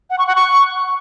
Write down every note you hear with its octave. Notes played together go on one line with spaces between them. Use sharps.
F#5
C#6
F#5
C#6